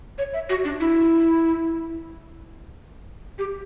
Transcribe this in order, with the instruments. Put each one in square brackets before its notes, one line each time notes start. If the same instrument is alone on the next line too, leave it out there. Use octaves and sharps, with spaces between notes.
[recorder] C#5
E5
F#4
D4
E4
G4